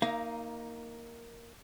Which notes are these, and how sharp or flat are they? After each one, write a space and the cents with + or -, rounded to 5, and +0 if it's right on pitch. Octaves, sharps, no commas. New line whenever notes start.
A#3 +0 D#4 +10 F5 -35